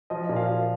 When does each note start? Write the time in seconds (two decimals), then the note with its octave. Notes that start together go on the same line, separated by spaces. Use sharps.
0.10 F3 D#5
0.29 A#2
0.36 F5
0.49 A#2